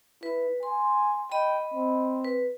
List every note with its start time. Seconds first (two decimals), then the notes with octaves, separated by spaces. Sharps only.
0.23 E4 B4
0.63 G#5 C6
1.32 D#5 G5 B5
1.74 C4
2.24 B4